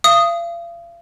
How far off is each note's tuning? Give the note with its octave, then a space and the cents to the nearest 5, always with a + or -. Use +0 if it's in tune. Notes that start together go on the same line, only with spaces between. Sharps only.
F5 -40 D#6 +0